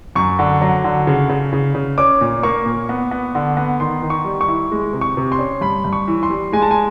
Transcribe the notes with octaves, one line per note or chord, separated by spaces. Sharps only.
F#2 C#6
D3
F#3
D3
C#3
C#3
C#3
C#3
C#4 D6
A#2
A#3 C#6
A#2
B3
B3
D3
B3
D#3 C6
D#3
C#6
G3
C#6
E4
G#3
C3
C#6
C3
C6
C#4
G2 B5
G2
C#6
E3
C6
G3
G#3 G#5
A5
G#5